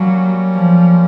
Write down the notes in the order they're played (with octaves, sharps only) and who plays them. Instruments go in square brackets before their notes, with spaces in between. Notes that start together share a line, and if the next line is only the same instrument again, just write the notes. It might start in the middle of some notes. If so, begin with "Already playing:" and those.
Already playing: [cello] F#3 [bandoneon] G3 A#3 C#4
[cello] F3